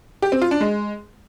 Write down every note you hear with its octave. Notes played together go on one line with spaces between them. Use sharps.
G4
C4
F4
D4
G#3